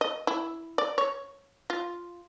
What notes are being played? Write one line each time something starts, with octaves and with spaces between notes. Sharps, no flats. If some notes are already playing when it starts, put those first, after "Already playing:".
D#5
E4
D5
C#5
F4